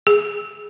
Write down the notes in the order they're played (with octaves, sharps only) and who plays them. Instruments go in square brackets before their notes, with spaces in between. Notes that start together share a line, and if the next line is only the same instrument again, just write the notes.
[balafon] G#4